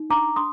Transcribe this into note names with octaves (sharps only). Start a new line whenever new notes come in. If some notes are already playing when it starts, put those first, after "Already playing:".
Already playing: D#4
D4 A#5 D6
D4 C6 D#6